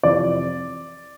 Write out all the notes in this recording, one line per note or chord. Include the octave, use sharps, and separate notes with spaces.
F2 C3 E3 D5